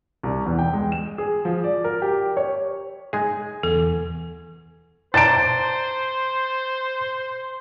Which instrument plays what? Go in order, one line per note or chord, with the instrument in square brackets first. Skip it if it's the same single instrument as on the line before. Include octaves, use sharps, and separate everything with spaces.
[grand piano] C2
E2
G5
G#3
E7
G#4
F3
D5
A#4
G4
C#5
[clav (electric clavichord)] G#3 D#4 G#4 [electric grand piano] G#5
[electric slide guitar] E2 [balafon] A4
[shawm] C5 [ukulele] D5 A5 A#5 [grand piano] A6 D7